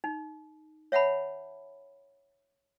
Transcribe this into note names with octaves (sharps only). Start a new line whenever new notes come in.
D#4
C#5 E5 F#5 A5 B5